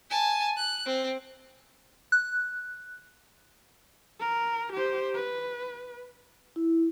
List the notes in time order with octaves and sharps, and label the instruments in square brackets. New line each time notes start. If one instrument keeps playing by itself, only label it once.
[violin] G#5 A5
F#6
C4
[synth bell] F#6
[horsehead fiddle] A#4
G4 C5
B4
[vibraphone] E4